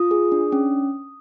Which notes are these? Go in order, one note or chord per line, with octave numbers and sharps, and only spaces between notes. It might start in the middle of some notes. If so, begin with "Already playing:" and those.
Already playing: F4 D#6
G#4
D4
C#4